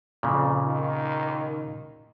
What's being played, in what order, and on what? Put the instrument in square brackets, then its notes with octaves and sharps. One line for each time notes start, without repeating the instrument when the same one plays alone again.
[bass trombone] F2 [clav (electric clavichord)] A#2 C#3
[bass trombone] D#3